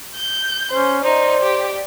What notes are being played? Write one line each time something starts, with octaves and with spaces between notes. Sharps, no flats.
G6
C#4 C5
D#4 C5 D5
G4